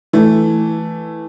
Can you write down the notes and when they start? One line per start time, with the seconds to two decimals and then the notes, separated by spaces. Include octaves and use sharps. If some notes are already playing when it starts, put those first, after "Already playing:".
0.13 E3 A3